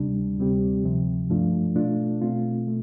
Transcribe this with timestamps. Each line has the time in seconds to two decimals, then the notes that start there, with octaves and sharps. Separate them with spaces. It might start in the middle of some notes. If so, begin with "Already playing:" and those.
Already playing: D2 C3 G3 D4
0.38 D2 C3 G3 C4 G4
0.84 D2 C3 F3
1.29 G2 F3 A3 D4 F4
1.75 B2 A3 D4 F4
2.22 B2 A3 C4 F4
2.67 B2 A3